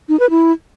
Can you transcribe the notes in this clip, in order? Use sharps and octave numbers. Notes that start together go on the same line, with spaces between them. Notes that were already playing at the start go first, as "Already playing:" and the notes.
D#4
B4
E4